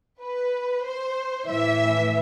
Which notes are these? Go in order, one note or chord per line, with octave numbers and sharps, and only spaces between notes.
B4
C5
A2 E3 E5